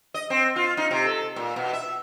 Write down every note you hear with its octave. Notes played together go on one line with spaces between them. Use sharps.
D#5
C4
F4
D#4
C3
A4
A#2
B2
E5